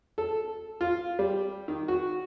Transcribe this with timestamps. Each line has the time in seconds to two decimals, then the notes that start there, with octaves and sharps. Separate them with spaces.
0.18 A4
0.81 F4
1.19 G3
1.68 D#3
1.88 F#4